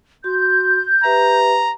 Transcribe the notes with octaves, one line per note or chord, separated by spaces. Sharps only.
F#4 C6 G6
G4 B4 E5 A#5